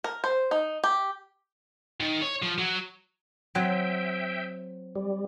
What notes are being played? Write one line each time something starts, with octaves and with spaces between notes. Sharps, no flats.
A#4
C5
D#4
G4
D#3
C#5
F3
F#3
F#3 C4 E5 G5
G3